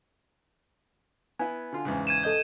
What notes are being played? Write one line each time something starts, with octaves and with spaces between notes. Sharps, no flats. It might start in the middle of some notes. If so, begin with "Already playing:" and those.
B3 E4 G#5
D3 F4
E2 G#2 C#3
G#6 D#7 E7
A4 D#5 G6